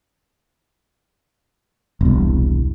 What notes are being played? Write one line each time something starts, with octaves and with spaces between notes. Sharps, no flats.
E1 C2